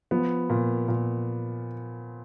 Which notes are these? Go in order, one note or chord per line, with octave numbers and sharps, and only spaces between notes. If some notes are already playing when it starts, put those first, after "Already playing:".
F3 B3
A#2
A#2